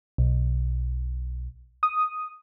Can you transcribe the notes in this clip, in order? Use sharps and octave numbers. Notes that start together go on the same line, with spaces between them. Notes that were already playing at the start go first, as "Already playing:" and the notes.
B1
D#6